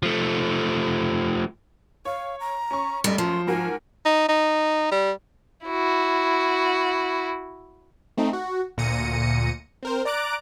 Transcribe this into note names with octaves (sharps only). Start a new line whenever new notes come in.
F3 A3
C#5 F5
A#5
C#4 C#6
F#2 G3 A3 D#5
F3 C6
G#2 F#4 A#4 G#5
D#4
D#4
G3
E4 F#4
A3 C4 D#4
F#4
D2 A#2 A#6 C#7 D#7
C4 A#4 C5
D5 A#5 D6 F#6 D7